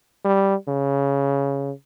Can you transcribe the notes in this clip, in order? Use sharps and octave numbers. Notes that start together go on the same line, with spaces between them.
G3
C#3